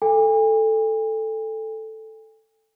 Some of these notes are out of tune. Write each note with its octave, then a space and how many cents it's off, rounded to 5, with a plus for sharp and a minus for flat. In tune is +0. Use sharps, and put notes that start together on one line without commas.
A4 +0 G#5 -45